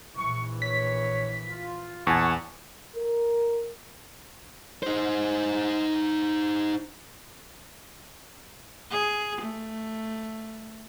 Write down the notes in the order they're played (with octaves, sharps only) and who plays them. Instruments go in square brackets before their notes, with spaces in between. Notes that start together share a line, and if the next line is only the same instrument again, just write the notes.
[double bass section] A#1 E3 [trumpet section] C#6
[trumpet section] C#5 [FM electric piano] B6
[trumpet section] F4
[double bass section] A#1 [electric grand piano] E2 [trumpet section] F#5 A5 [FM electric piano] G#5 C#6
[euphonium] A#4
[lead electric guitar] D#4 C5
[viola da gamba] G#4
A3